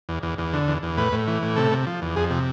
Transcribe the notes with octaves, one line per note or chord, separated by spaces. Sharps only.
E2
E2
E2
D3
E2
E2
A2 B4
A2
E3
A2
C3 A4
C3
F3
E2
F2 G#4
C3